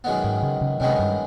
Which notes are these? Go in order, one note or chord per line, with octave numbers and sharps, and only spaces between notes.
F#2 D#3 G#3 B3
G#2
C#3
C#3
F#2 C3 D#3 G#3 B3
G2